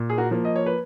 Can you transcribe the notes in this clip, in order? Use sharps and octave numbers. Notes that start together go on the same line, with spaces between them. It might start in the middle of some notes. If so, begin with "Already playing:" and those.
Already playing: A#2
G#4
F#4 A#4
F3 A#3
D#5
C#5
B4